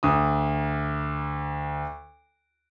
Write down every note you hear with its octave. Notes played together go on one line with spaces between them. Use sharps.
D2 D#6